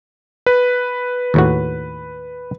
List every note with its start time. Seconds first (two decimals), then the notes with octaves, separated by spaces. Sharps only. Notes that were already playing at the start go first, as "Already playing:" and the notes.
0.46 B4
1.34 D#2 A2 F#4